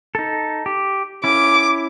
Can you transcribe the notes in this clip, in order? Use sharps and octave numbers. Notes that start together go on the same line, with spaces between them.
D#4 A4
G4
C#4 E4 D6